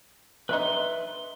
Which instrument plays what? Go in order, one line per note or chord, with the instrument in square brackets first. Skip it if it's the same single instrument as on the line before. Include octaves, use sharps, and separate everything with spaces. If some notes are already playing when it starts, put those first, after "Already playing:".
[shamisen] D4 D#4 [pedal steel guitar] B4 E5 C6